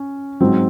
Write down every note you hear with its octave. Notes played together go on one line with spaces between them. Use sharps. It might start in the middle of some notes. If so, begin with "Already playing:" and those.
Already playing: C#4
G#2 F#3 C4